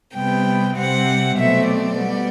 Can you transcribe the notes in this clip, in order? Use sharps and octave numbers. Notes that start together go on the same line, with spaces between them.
C3 G3 B3 G5
C3 G3 C4 F#5
B2 F#3 A3 C4 E5
D5
G3 B3